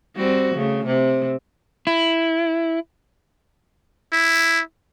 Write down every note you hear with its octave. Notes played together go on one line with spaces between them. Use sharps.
G3 C4 F#4
C#3 A3
C3
E4
E4